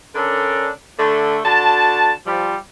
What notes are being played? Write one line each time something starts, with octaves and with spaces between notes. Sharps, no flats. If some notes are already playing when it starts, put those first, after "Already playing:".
D3 C#4 D4 A4 A#4
D3 A3
D3 F#4 A5
F3 G3